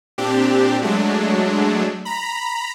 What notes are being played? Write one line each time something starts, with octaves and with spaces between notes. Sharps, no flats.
A#2 C4 D4 G4
F#3 G#3 A3 D4
A#5 B5